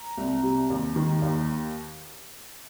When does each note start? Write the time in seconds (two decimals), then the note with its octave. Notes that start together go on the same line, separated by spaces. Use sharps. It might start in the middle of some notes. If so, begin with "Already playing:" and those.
Already playing: A#5
0.17 C2
0.43 C3
0.70 D#2
0.96 D#3
1.22 D#2